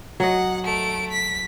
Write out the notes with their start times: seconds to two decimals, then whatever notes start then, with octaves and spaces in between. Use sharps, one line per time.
0.20 F#3 D#5 F#5
0.64 A3 D7
1.11 B6